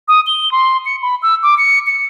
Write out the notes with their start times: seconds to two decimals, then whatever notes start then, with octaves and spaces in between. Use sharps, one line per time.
0.08 D#6
0.27 G7
0.52 C6
0.86 C#7
1.02 B5
1.23 E6
1.43 D6
1.58 C#7
1.87 C#7